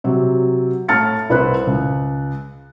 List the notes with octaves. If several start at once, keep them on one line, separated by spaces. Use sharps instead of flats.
C3 F#3
A2 A5 F6 A6 C#7
C2 E4 B4 C5 F#6
C#2